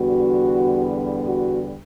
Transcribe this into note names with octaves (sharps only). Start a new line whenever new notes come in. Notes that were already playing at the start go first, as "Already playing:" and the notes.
Already playing: E2 D3 G3 B3 F#4
F#4